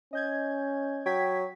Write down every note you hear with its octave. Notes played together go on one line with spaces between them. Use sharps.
C#4 D#5 G6 G#6
F#3 G5 G#6 B6